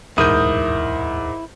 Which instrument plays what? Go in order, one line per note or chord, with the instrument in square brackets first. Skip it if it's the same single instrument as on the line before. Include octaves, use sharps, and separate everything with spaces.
[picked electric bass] D1 B1 E2 [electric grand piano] G#2 A#4 G6 [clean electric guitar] E4 [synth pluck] D#6